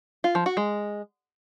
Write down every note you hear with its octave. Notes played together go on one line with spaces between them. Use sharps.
F4
F3
F#4
G#3